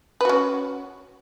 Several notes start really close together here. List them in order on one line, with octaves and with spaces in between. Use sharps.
B4 F#4 C#4